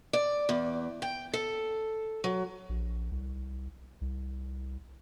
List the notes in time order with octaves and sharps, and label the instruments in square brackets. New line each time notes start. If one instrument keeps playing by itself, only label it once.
[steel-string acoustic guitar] D5
E2
G5
A4
F#3
[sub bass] A#1
C2
C2